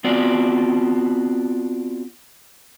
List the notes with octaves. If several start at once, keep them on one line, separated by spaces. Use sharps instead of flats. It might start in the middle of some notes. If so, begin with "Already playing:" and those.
B3 C4 F4 F#4 D5